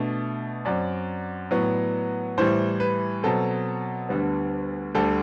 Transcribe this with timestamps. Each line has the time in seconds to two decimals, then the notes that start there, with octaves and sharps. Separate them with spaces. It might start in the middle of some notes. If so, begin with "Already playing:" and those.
Already playing: B2 A3 D4
0.65 F#2 F#3 C4 D5
1.51 A2 F#3 B3
2.38 A2 E3 G3 C5
2.80 B4
3.23 B2 F#3 C4 A4
4.09 D2 D3 G3 B3
4.95 D2 D3 G3 A4